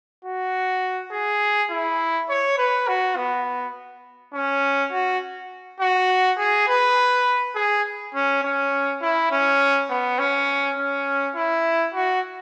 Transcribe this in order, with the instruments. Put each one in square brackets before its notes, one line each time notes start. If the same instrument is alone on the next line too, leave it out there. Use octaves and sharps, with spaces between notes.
[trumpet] F#4
G#4
E4
C#5
B4
F#4
B3
C#4
F#4
F#4
G#4
B4
G#4
C#4
C#4
E4
C#4
B3
C#4
C#4
E4
F#4